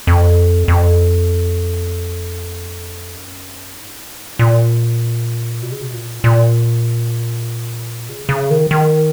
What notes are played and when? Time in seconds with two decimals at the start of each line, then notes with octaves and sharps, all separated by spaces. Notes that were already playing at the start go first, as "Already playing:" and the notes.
0.07 F2
0.68 F2
3.15 F#2
3.77 G#2
4.39 A#2
5.62 B2
5.72 C#3
5.81 B2
5.93 A#2
6.24 A#2
8.09 C#3
8.29 C#3
8.50 D#3
8.71 D#3